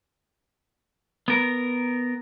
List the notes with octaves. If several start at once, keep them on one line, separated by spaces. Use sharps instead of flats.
B3 A#4